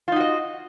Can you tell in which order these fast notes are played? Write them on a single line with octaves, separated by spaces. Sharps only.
F4 D#4 F#4 D#5